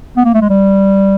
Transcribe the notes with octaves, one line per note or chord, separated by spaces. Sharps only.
B3
A#3
A3
G#3
G3